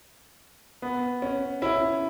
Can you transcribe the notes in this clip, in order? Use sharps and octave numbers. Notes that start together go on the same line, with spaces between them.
B3
C#4
C#4 E4